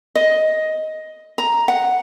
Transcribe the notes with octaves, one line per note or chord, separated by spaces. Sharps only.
D#5
A#5
F#5